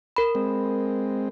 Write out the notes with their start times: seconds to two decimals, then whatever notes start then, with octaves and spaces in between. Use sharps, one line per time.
0.17 A#4 B5
0.35 G#3 C4